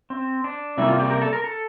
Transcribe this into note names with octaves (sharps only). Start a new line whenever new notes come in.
C4
D4
C3 G3 A#3 E4
F4
G4
A#4
A4
A#4
A4